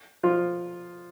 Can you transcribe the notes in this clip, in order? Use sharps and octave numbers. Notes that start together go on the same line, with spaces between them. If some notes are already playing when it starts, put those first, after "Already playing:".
F3 F4